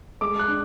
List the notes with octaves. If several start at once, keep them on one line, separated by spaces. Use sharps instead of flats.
G#3 D6
F#6
D4